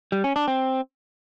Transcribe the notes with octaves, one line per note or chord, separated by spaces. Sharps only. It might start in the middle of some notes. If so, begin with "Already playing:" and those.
G3
C#4
D4
C4